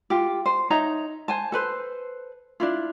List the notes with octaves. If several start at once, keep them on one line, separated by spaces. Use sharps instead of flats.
F4 G4
C5
D#4 C#5 E5 A#5
C5 G#5 A5
A4 B4 C5
D4 E4 F4